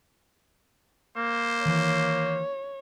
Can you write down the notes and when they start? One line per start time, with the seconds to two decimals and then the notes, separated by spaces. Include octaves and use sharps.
1.17 A#3 C5
1.66 D#3 E3 C#5